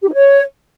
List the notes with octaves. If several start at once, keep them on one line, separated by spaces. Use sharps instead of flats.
G4
D#4
C#5